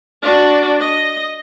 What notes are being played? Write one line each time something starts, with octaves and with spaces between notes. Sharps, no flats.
D4 F#4
D#5